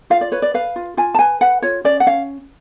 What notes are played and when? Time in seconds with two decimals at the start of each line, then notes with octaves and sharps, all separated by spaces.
0.10 F4 F5
0.21 D5
0.32 B4 C#5
0.42 D5
0.54 B4 F5
0.76 F4
0.97 F4 G#5
1.14 A5
1.19 B4 G#5
1.41 B4 F#5
1.62 F4 C#5
1.84 C#4 D5
2.00 F#5
2.06 C#4 F5